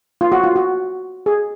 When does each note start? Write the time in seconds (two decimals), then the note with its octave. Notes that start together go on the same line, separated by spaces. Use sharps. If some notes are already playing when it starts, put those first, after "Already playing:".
0.21 F4
0.32 F#4
0.43 F4
0.56 F#4
1.26 G#4